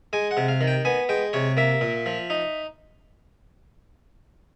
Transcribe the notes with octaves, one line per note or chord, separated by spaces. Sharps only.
G#3 G#5
F#5
C3
F5
D#3
G5
B3 G#5
G#3 G5
C3 C#5
A#3 E5
A#2
F3
D#4